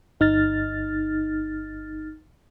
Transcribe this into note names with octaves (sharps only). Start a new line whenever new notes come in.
G1 D#4 F6 A6